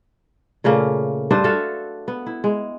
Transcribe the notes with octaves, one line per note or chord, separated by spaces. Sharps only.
A#2 C#3 A3 A#3
G2 D4 B4 C5
F#4 A4 E5 F5
B3
E4
G#3